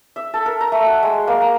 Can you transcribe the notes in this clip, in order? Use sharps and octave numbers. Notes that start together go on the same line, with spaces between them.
E5
A4
A#4
A#5
A3
F#4
G#3
A#3
A#5